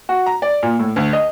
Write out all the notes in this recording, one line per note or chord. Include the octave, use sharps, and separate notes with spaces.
F#4
A#5
D5
A#2
A2
D2
D#5